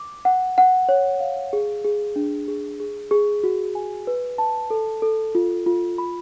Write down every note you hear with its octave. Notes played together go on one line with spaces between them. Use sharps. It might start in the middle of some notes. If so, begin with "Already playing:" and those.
Already playing: D6
F#5
F#5
C#5
F5
G#4
G#4
D4
G#4
G#4
G#4
F#4
G#5
B4
A5
A4
A4
F4
F4
B5